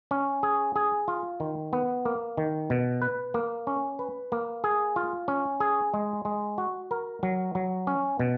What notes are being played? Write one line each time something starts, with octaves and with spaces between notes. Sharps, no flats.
C#4
G#4
G#4
F4
D#3
B3
A#3
D#3
B2
B4
A#3
C#4
B4
A#3
G#4
F4
C#4
G#4
G#3
G#3
F#4
A#4
F#3
F#3
C#4
B2